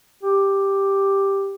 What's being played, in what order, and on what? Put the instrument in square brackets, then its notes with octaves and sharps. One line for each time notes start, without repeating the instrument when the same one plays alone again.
[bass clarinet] G4